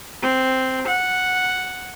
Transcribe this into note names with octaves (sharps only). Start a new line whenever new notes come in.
C4
F#5